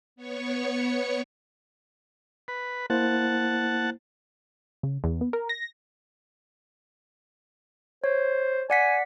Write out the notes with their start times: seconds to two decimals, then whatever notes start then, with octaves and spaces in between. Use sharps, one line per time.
0.16 B3 C#5 C#6
2.48 B4
2.90 A#3 E4 C5 F#5 A5
4.83 C#3
5.04 E2
5.21 B3
5.33 A#4
5.49 A#6
8.04 C5 C#5
8.70 D5 F#5 G#5 B6